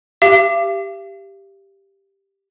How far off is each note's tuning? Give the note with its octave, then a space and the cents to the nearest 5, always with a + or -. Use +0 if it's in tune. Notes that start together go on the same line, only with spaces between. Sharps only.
G4 +0 F5 -45